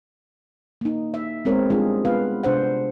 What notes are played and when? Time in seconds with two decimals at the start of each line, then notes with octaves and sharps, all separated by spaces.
0.81 A#3 D#4
1.14 E5
1.45 G#3 B3 C4 A#4 C#5
1.70 G3 G#3 D4 D#4 F4 G#4
2.05 B3 F4 B4 F5
2.43 C3 D4 C5 F#5